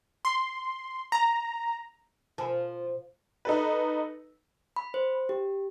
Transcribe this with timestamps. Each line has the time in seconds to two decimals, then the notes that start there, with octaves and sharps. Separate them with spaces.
0.25 C6
1.12 A#5
2.38 B2 F3 G#5 A5
3.45 D#4 A4 B4
4.76 B5
4.94 C5
5.29 G4